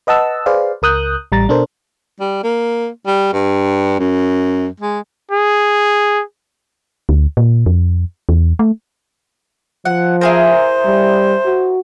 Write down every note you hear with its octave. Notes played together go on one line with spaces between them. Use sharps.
B4 D#5 F#5 A5 E6
G#4 B4 C5 D5 F5
C#2 A#4 D#6 F#6 G6
A1 G3 A#5 A6
B2 D4 A4 A#4 C5
G3
A#3
G3
G2
F#2
G#3
G#4
D2
A#2
F2
E2
A3
F3 F#5
E4 G#4 A#4 C5
G3
F#4